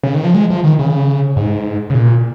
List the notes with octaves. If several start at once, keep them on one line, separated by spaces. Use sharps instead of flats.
C#3
D#3
F3
G#3
F3
D#3
C#3
G#2
C#3
A#2